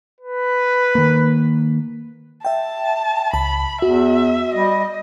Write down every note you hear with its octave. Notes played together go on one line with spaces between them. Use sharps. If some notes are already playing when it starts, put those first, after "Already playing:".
B4
D#3 A#3
E5 G5 A5
C#2 A5 B5
E2 F#4 E5
G3 D#5